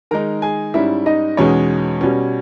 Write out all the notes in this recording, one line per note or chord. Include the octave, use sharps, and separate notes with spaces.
D#3 G#3 D#4 A#4 A#5
G#4 G#5
G#2 G3 C#4 E4 E5
D#4 D#5
E2 B2 G#3 C#4 D#4 C#5
B2 G3 C#4